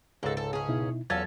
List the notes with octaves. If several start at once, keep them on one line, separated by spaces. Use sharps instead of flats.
C#2 G#2 G#3 A4 C5
A4
C#4 G#4
B2 D#4 E4
E2 F#3 C#4 F4 A4 G#6 A6